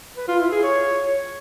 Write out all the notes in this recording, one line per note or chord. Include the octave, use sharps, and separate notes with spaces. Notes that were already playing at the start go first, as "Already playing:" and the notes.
B4
F4
E4
G#4
C#5